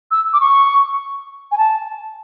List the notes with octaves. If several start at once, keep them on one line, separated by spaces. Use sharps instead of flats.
E6
D6
C#6
G#5
A5